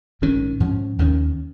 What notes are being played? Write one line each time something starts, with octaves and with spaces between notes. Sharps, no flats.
A#1 G#2 D#3 C#4
G#2 F3 C#4
D#2 D#3 G#3 C#4